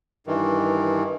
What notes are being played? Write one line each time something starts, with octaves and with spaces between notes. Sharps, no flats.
G2 D#3 E3